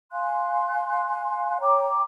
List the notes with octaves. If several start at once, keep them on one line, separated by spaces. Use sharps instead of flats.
F5 G#5 C6 F#6
C#5 G5 A#5 D6